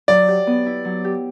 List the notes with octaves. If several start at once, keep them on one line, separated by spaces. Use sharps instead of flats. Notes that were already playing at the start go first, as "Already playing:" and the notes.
F#3 D5
G4
B3
E4
F#3
G4